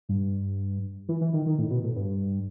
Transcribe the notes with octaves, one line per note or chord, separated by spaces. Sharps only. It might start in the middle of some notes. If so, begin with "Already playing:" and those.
G2
E3
E3
D#3
D#3
A2
B2
A2
G2